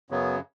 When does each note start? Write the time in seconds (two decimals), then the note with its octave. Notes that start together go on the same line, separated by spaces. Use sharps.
0.10 F#2 C#3 F#3 B3